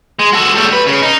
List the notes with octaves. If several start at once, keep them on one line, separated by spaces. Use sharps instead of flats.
G#3
F#4 A4
G3 A3
B4
C#3
D#4